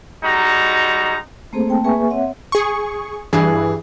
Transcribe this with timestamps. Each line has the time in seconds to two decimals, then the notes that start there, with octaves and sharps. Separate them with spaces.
0.24 G3 G#3 D#4 F#4 A#5
1.53 A3 A#3 C4 G#4 A4 C5
1.68 A3 A#3 C4 G5 A5
1.84 A#3 G#4 B4 E5 G#5 C#6
2.10 C4 C#5 E5 F#5
2.52 G#4 C#6
3.33 G2 E3 G#4